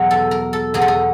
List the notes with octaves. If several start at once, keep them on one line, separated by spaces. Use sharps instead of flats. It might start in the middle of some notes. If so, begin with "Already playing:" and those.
Already playing: E2 B2 F#3
A4
A#4
A4
E2 B2 F#3 G#4
A4
G#4